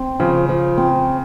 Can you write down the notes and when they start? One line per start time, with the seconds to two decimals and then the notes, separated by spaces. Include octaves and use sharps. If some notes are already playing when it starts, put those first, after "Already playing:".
Already playing: C4
0.20 C#3 F3
0.49 F3
0.78 C4